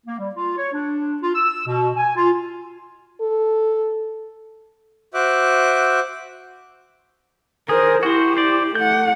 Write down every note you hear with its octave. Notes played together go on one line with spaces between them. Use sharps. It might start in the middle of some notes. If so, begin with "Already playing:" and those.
A#3
G3
F4
C#5
D4
F4
E6
B2
G#5
F4
A4
F#4 C5 E5 D6 F#6
D#3 G#4 A#4 C5
E4 F#4 G4 C5
C5 D5
A3 F#5 G6